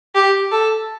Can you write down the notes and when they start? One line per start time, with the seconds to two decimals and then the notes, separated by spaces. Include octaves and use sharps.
0.15 G4
0.52 A4